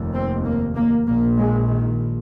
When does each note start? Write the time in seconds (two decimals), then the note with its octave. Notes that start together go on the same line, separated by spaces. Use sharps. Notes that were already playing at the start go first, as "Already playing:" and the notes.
Already playing: F1 D#2
0.14 C4
0.45 A#3
0.75 A#3
1.06 A#1 A#2 A#3
1.38 G#3
1.69 D#3